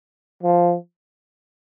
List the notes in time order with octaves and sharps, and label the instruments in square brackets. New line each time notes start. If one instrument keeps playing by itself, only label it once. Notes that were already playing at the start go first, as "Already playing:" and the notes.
[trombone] F3